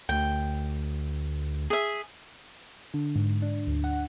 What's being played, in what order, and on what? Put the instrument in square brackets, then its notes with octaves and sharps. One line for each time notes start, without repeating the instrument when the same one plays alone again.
[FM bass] D2 [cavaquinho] G5
[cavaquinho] G#4 E5
[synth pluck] D3
G#2
D4
D2
F#5